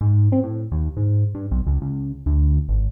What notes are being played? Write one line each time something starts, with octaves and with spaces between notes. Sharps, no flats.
G#2
C4
A2
D#2
G#2
G2
B1
C#2
C#2
D2
G#1